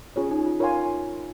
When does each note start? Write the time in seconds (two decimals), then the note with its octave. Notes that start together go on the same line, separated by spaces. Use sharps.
0.16 C#4 F4 G#4 C#5
0.31 D#4
0.46 F4
0.60 F4 A#4 C#5 F5 G#5 C6